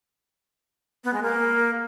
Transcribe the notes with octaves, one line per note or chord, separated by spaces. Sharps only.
B3
G#3
A#3